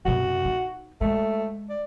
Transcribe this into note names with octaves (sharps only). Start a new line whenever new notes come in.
F#2 C3 F#4
D#4
G#3 A3
D5